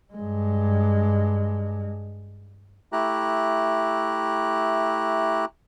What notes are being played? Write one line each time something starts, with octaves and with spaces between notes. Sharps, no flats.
G2 G#3
A3 E4 G4 A#5 F#6